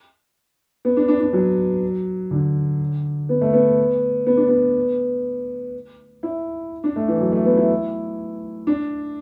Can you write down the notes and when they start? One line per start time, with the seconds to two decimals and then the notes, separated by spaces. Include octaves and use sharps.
0.85 B3
0.97 D4
1.08 D4
1.20 D4
1.33 F#3
2.31 D3
3.29 B3
3.41 A3
3.53 B3
4.27 B3
4.37 D4
4.48 B3
6.23 E4
6.84 D4
6.96 A3
7.08 E3
7.21 F#3
7.32 A3
7.46 B3
7.57 E4
8.67 D4